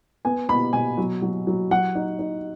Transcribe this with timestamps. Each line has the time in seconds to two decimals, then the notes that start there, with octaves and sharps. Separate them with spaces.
0.25 B3 G#5
0.48 B2 B5
0.73 B2 G#5
0.98 F#3
1.22 F#3
1.47 F#3
1.71 F#3 F#5
1.95 D#4
2.19 D#4